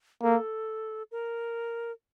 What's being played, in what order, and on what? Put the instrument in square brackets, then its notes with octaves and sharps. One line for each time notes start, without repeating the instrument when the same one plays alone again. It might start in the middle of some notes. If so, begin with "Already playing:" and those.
[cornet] A#3 [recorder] A4
[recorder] A#4